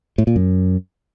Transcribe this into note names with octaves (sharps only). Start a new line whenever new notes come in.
A2
A#2
F#2